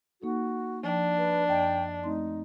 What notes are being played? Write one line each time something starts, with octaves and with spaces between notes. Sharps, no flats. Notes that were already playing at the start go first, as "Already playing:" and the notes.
A#3 D#4 F#4 A4
F3 D4 D5 G5
B4
F#2 D#5 G5 A5
A3 C4 D#4 C6